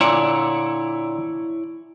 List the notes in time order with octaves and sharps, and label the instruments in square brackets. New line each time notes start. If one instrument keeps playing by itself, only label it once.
[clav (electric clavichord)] A#2 D3 [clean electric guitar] E4 C#5 D5